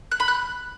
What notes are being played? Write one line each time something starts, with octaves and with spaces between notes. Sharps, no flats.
F#6
B5
F#6